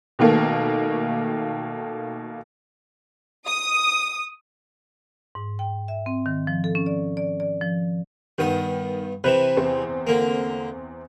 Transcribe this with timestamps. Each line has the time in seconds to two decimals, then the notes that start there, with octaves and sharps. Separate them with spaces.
0.19 B2 D#3 A3 A#3
3.46 D#6
5.35 G#2
5.59 G5
5.88 E5
6.06 C4
6.26 D#3
6.47 F3
6.64 A4
6.75 C#4
6.86 D5
7.17 D5
7.40 D5
7.61 F3
8.38 G2 D#3 B3 D#6
9.24 C3 E3 B4 E7
9.57 E2 C4
10.07 D3 A#3